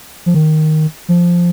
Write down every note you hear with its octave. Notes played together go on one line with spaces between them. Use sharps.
F3
D#3
F3